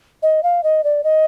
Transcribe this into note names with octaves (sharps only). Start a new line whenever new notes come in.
D#5
F5
D#5
D5
D#5